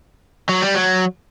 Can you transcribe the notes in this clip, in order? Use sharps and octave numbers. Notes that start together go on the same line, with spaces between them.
F#3
G3
F#3